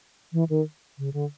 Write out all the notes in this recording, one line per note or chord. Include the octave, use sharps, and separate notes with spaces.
E3
D#3
C#3
D3